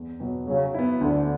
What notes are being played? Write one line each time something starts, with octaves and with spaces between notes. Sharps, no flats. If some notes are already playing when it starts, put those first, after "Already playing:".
Already playing: E2
B2 F#3 B3
C#3 F#3
B3 E4
D2 D3